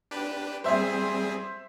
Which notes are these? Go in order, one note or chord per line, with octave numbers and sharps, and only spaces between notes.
D4 G4 B4
G3 C4 G#4 C5 E5